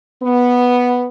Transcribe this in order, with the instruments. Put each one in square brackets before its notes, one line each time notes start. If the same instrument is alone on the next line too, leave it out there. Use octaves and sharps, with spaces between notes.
[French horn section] B3